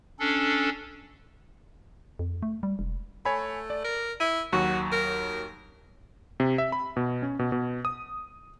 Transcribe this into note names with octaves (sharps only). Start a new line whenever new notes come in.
C#4 D4 A4
F2
A3
G3
E1
A3 C#5 G#5 B5
D5
A#4
E4 D#7
D#2 F#3 F#4 C#6
A#4
C3
E5
B5
B2
C#4
B2
B2
D#6